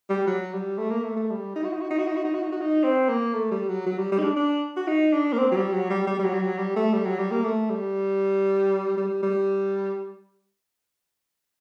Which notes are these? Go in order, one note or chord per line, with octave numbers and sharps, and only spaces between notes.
G3
F#3
G3
A3
A#3
A3
A3
G3
D#4
F#4
D#4
F#4
D#4
F#4
D#4
F#4
D#4
F#4
D#4
F#4
D#4
C4
A#3
A3
G3
F#3
F#3
G3
G3
D#4
D4
D4
F#4
D#4
D4
A#3
C4
F#3
G3
F#3
G3
G3
G3
F#3
G3
F#3
G3
A3
G3
F#3
G3
A#3
A3
G3
G3
G3